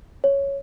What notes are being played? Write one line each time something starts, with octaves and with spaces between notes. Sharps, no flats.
C#5